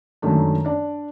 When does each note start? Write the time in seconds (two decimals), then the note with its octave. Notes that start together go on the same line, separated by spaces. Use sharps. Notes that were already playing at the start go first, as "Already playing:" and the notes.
0.22 F#2 D#3 G#3 A3 D4
0.65 D4 D5